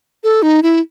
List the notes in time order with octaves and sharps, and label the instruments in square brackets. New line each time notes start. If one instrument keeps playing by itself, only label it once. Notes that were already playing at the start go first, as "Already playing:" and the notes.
[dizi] A4
D#4
E4